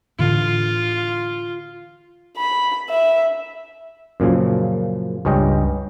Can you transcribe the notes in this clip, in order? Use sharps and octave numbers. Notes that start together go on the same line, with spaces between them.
A2 D3 E3 F4
B5
E5
F#2 A#2 C#3 F3
C#2 G2 C#4 D#5 G5